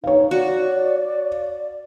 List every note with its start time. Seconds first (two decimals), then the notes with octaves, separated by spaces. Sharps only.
0.04 D#4 C#5 F5
0.31 F#4 D5